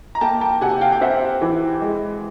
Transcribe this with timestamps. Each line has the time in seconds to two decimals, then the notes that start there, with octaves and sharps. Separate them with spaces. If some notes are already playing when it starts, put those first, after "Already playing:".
0.15 A#5
0.21 A#3 G5 A5
0.41 G5 A5
0.61 C3 F#5 G#5
0.81 F5 G5
0.92 G5
1.01 C4 E5 F#5
1.41 E3
1.82 G#3